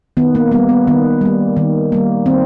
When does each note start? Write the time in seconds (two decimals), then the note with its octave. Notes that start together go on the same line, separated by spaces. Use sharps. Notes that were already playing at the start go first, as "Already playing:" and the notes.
0.17 D#3 B3
0.35 A#3
0.52 G3 A#3 B3
0.69 B3
0.87 D#3 B3
1.21 G3 A#3
1.57 D#3
1.92 G3 A#3
2.26 D#3 C4